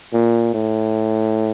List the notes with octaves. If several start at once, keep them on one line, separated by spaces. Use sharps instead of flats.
A#2
A2